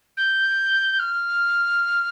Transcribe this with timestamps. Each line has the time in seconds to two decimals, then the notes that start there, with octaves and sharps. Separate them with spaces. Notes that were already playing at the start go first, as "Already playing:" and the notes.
0.17 G6
0.99 F6